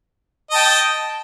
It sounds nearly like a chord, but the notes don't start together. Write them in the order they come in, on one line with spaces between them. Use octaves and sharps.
D#5 A5 G5